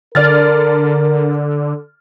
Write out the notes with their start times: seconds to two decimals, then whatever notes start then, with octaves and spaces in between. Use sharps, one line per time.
0.15 D3 A#4 D5 F6 A6